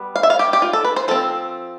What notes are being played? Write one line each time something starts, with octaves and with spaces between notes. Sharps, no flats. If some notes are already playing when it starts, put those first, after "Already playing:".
Already playing: G3 B3
F5
E5
F5
G4
G4
F4
A4
B4
C5
F3 C4 A4